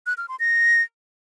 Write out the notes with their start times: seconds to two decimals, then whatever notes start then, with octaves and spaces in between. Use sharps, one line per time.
0.06 F#6
0.17 F6
0.29 C6
0.40 A#6